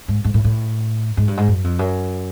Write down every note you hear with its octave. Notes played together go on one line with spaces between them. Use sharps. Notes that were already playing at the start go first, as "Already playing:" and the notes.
G#2
G#2
A2
A2
G#2
G2
G#2
F#2
F2
F#2